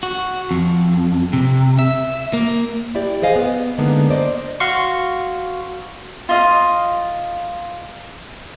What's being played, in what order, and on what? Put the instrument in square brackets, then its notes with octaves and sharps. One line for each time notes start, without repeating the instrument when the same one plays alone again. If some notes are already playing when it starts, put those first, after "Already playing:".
[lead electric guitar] F#4
F2
C3
E5
A#3
[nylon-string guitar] E4 G4 D5
G#4 C5 D#5 F5 G#5
B3
D3 G#3 A#3 B3 D4 D#4
C5 D5 D#5
[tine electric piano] F#4 F5 C6 C#6
[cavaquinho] F4 D#5 F5